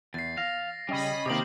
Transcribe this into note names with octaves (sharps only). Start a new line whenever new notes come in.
E2 A6 C7
F5 A#6
C#3 G3 C#4 D#5 B5
C3 D#3 A#3 C4 G4 D6 D#6 F#7